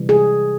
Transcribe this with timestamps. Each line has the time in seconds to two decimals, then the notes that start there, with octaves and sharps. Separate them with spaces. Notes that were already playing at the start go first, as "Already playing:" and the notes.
Already playing: C3 E3 G3
0.09 G#4